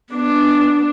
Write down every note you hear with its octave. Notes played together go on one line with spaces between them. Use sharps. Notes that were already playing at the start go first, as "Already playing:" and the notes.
B3 D4